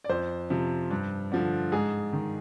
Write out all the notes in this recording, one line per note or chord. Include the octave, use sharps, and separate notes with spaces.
D5
F2 C5
C3 F3
G2
D3 F3
G#2 G#4
D#3